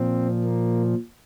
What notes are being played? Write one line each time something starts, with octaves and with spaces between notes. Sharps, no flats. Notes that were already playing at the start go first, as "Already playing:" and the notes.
Already playing: A#2 F3 C4
A#3